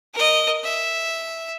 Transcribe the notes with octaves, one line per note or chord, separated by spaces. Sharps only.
A#4 D#5
E5